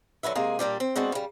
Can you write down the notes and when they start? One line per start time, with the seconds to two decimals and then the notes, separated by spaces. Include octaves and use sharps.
0.23 D3 F#3 B4 E5
0.35 C3 G#3 A#3 G#4
0.59 A#2 G3 D4 G4
0.80 C4
0.96 G#3 B3 C4 D4 F#4
1.12 C#3 G3